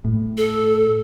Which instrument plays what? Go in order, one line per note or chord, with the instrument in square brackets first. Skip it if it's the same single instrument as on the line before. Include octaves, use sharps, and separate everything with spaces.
[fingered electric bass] A2
[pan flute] A4